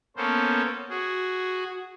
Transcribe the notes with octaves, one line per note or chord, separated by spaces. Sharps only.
A#3 B3 C#4 A4 C5
F#4 G#4